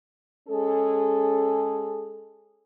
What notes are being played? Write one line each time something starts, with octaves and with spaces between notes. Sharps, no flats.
G#3 C#4 G#4 A4